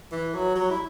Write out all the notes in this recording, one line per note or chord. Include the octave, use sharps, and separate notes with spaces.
E3
F#3
F#3
E4